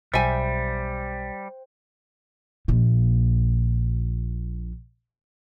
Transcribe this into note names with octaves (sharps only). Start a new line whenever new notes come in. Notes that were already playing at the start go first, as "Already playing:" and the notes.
B1 G3 C5 E5 G5 G#5
A#1 A#2